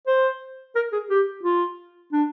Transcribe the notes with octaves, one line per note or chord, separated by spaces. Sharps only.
C5
A#4
G#4
G4
F4
D4